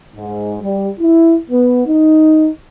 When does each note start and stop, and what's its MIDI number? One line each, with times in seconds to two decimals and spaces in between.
0.15 0.56 44
0.61 0.89 55
1.00 1.35 64
1.50 1.83 59
1.86 2.49 63